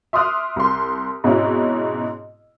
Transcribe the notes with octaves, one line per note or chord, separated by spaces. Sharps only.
E5 C6 D6 D#6 F6 F#6
C2 C6
G#2 B2 C4 C#4 E4